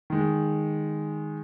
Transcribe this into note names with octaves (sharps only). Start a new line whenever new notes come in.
D#3 G#3